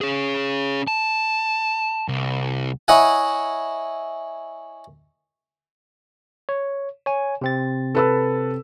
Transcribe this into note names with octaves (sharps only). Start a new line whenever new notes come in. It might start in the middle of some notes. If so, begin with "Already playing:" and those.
C#4 G#4
A5
C2
E4 C#5 D#5 E5 F#5 G#5
C#5
C#5 G#5
C3 C4 A6
A4 B4 E6